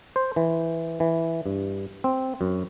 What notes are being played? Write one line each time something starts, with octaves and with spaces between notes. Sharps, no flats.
C5
E3
E3
G2
C4
F#2